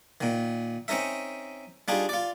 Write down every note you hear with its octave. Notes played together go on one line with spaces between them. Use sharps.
A#2 D#3
C4 C#4 D#4 A#4 E5
G3 D4 D#4 F4 G#4
F4 D5